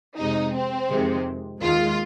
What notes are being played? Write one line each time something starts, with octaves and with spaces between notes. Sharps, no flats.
F2 C3 G#3 D#4
C4
F2 C3 D#3 G#3
D#2 D#3 G#3 F4